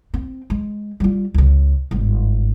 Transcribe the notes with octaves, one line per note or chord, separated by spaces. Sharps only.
C4
G#3
G3 F4
C#2 C#3
G1 G#2